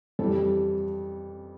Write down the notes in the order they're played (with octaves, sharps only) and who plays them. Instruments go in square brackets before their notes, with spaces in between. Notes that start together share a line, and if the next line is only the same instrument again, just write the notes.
[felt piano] F2 E3 G3 A4